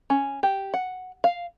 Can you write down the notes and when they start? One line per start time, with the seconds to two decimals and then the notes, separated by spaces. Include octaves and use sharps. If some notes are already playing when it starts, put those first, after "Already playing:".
0.10 C#4
0.43 G4
0.74 F#5
1.24 F5